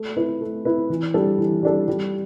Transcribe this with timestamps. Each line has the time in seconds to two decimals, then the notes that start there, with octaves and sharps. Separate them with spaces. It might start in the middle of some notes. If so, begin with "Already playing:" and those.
Already playing: A3
0.17 E4 B4
0.41 A3
0.65 E4 B4
0.90 E3
1.14 G3 D4 A4
1.38 E3
1.63 G3 D4 A4
1.88 G3